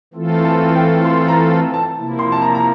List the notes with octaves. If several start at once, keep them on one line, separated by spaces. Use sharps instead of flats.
E3 A3 C4 F4 A4
A5
G5
C6
A#5
A5
A5
C3 F3 A#3 E4
C6
A5
A#5
A#5